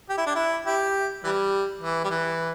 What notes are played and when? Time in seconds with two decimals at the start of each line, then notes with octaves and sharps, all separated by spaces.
0.09 G4
0.17 E4
0.26 D4
0.35 E4
0.66 E4 G4
1.24 E3 G3
1.82 E3
2.04 G3
2.11 E3